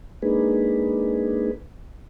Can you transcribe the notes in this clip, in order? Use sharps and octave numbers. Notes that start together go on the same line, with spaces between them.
G#3 A#3 D4 D#4 G#4 B4